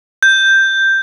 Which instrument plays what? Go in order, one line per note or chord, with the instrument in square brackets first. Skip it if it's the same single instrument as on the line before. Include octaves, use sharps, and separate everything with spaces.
[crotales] G6